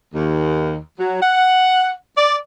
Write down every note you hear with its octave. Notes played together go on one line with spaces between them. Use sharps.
D#2
F#3
F#5
D5